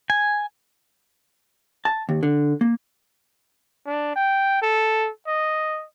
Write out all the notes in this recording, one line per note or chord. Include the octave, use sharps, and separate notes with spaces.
G#5
A5
D#2
D3
A#3
D4
G5
A4
D#5